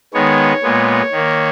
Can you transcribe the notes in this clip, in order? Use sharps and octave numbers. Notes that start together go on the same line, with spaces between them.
D#3 G#3 B3 C#5
A#2 G#3 B3
D#3 A#3